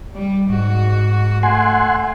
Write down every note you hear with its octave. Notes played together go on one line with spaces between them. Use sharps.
G3
G#2 F#4
A3 F#5 G#5 C6